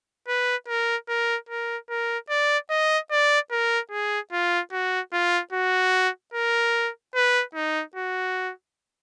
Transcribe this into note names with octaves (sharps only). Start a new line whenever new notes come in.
B4
A#4
A#4
A#4
A#4
D5
D#5
D5
A#4
G#4
F4
F#4
F4
F#4
A#4
B4
D#4
F#4